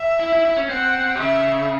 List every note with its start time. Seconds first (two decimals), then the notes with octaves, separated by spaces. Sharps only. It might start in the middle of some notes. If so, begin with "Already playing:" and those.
Already playing: E5
0.20 E4
0.32 E4
0.45 E4
0.57 C#4
0.69 C4 F#5
1.15 C3
1.20 C#3 E5